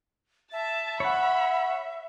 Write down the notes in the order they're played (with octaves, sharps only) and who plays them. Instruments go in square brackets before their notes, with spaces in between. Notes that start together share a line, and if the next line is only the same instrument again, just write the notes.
[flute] E5 [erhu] A5
[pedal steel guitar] C#5 F#5 [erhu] B5